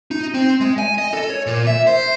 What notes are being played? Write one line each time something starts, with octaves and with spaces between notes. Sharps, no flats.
D#4
C4
G#3
G#5
D#5
A4
C#5
A#2
E5
C5